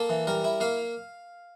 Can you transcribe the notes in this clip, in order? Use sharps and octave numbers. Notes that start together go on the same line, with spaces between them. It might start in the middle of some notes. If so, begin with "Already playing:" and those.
Already playing: A#3 A4
E3
G3 A#4
E4
A#3 F5